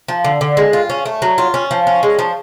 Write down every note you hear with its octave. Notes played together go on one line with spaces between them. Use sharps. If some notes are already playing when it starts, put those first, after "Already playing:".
F3
D3
D3
G#3
F4
C#4
A3
F#3
F4
C#4
F3
C#4
G#3
F3